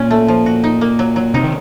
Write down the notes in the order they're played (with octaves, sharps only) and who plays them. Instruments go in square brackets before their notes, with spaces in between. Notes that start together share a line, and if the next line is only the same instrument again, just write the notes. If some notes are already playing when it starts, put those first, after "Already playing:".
Already playing: [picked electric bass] A#2 [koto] C#4
[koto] A3
F3
F#4
D#4
A#3
F#3
F#3
[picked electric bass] C3 [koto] D#4
[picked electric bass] D#3